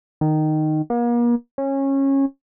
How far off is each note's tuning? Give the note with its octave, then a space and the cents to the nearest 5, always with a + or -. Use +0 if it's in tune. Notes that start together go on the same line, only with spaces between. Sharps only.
D#3 -10
A#3 +40
C#4 -20